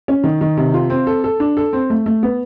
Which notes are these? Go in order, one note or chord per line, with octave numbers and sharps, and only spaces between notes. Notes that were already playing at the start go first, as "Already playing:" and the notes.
C#4
D#3
D#3
C3
F4
C4
A4
A4
D4
A4
C4
A3
A3
B3